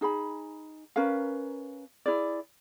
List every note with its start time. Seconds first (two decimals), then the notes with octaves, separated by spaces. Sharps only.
0.01 D#4 G#4 G#5 B5
0.96 C#4 A#4 B4 F5
2.06 E4 G#4 D5